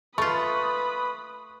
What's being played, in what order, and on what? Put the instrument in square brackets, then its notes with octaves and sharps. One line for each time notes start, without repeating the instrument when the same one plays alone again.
[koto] A3 F4 [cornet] B4 [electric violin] B5 D#6 [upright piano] C#6